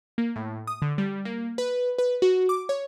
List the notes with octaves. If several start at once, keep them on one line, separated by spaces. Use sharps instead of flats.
A#3
A2
D#6
D3
G3
A#3
B4
B4
F#4
D6
C#5